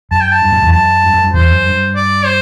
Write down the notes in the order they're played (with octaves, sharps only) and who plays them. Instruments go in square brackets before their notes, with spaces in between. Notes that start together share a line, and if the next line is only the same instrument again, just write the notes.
[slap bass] F#2 [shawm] A5
[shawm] G5
A5
[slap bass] G2
F#2
E2
[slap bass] F#2 [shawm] A5
[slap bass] G2
F#2
G2
[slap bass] E2 [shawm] C5
[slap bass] F#2
G2
[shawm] D5
C5